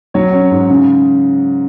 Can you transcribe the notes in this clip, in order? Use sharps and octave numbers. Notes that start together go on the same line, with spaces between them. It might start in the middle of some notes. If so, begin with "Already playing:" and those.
F#3 C#5
C#4
G#2
C#3